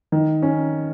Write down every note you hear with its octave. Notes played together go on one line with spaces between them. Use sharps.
D#3
C#4